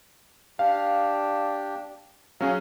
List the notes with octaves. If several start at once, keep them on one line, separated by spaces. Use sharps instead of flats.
D4 G4 F5
F#3 C#4 G#4 F5